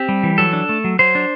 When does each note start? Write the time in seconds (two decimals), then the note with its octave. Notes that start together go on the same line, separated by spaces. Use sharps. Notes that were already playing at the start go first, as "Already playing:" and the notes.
Already playing: C4 G4
0.09 G3
0.23 E3
0.38 F#3 A4
0.53 D4
0.69 A3
0.84 F#3
0.99 F#3 C5
1.15 D4